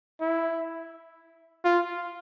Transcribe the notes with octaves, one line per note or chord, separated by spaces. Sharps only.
E4
F4